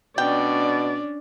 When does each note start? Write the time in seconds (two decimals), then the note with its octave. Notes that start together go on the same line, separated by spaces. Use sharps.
0.18 B2 C#4 D4 D5 G5